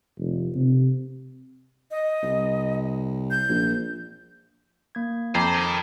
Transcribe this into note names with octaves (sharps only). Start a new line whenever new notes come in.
F1
C3
D#5
C2
G6
A#1
A#3 G#6
F2 C5 A#5 D6
A#4 D#5